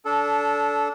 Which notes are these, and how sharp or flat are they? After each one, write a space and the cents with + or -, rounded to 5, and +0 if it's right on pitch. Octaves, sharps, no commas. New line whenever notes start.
D4 -25 A4 -10